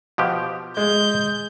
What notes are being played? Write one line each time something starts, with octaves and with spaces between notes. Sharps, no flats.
B2 F3 G4
G#3 G6